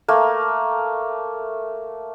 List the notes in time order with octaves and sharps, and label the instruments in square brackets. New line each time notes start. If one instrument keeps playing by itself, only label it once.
[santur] A3 A#3